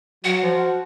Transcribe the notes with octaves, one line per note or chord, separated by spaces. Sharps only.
F#3 F#4 F#5
F3